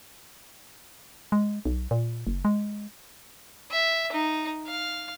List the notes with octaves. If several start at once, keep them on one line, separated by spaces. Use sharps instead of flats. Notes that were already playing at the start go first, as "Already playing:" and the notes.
G#3
B1
A#2
F#1
G#3
E5
D#4
F5